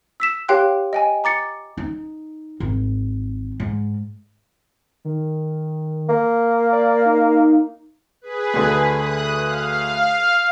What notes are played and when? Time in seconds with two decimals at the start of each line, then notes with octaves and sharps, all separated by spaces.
0.20 E6 B6 E7
0.48 G4 C#5 F5 G5 C6 F#6
0.93 D#5 G5 G#5
1.24 A#5 D6 A6 C#7
1.77 D#4
2.60 G#1
3.60 G#2
5.05 D#3
6.09 A#3
6.72 D5
7.06 D#4
8.21 G#4 B4
8.54 D2 D3
8.95 D#6 F#6
9.41 F5